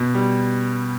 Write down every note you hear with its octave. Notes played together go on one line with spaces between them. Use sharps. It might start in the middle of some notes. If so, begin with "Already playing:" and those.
Already playing: B2
G3